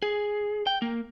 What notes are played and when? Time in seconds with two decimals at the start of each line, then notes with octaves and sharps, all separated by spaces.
0.02 G#4
0.67 G5
0.82 A#3